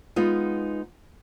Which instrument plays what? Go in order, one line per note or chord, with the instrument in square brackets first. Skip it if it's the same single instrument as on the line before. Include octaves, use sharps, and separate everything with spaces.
[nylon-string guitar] G#3 B3 D#4 F4